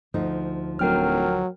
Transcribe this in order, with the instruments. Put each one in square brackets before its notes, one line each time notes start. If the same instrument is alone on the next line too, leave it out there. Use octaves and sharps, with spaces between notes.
[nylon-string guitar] D2 F3 D#4
[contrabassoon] D1 [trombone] F#3 [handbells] A#4 G5 F6